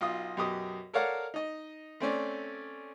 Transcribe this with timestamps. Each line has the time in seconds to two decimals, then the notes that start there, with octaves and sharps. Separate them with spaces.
0.01 B1 F4 D#6
0.37 F#2 B2 G4 D#6
0.94 A4 A#4 C#5 D5 F5 F#5
1.34 D#4 D#5
2.00 A3 C4 C#4 D5